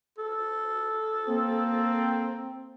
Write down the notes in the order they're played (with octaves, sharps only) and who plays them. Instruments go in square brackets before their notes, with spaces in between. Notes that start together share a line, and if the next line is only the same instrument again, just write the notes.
[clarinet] A4
[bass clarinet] A#3 [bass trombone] C4